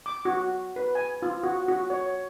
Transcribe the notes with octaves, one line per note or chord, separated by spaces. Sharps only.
D6
F#4
B4
G#5
F4
F#4
F#4
C#5